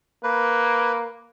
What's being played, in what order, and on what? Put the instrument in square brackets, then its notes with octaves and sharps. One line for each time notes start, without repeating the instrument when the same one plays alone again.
[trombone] A#3 [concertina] B4